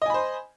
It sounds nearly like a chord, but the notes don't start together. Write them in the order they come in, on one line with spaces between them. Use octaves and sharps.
D#5 G#5 B5 C5